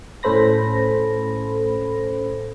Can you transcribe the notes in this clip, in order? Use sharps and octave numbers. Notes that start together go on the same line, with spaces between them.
A2 C#4 A4 C5 B5 A#6